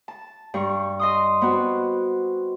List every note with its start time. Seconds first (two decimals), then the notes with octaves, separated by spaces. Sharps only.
0.08 A5
0.54 G2 C#6
0.99 D#5 C6 D#6
1.42 B3 C4 F#4